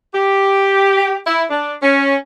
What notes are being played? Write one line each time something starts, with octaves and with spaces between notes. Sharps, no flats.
G4
E4
D4
C#4